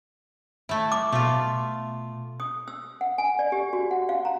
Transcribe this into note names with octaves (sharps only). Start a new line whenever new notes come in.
A3 E4
D6
B2 A3 F4
D#6
E6
F#5
G#5
D5
G4
F#4
F#5
F5
A#5